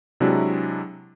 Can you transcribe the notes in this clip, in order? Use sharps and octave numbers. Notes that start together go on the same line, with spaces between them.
C3 F#3 G#3 D4 E4 F#4